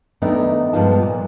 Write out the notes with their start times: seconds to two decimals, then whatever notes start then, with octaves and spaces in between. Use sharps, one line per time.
0.22 F#2 D#3 A3 B3 D4
0.73 G2 F3 G#3 B3 F4 A5
1.02 A#2